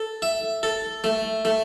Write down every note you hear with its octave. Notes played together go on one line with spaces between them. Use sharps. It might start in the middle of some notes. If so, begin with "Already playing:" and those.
Already playing: A4
E5
A4
A3
A3